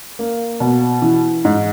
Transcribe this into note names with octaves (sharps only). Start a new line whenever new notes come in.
A#3
B2
E3
G#2